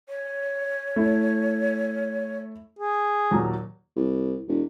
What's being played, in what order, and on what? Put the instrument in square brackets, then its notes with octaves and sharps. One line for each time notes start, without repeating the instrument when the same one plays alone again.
[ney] C#5
[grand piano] A3 E4
[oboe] G#4
[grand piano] D#2 A#2 F#3
[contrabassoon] C2
E1